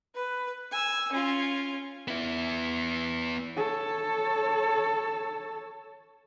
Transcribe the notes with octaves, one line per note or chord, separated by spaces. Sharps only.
B4
G#5 E6
C#4 F4
B3 E4
A4 C#5